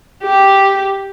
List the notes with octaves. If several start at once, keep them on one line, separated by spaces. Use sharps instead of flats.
G4